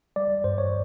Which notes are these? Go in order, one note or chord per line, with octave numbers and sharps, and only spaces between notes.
G3 D5
G2 C5
C#5